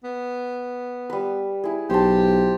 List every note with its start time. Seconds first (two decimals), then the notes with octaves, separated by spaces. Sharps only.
0.04 B3
1.10 G3 B4
1.64 E4 G#4
1.90 B1 G4 C5 A5